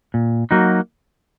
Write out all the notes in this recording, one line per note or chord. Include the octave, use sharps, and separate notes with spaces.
A#2
F#3 A#3 D#4 F#4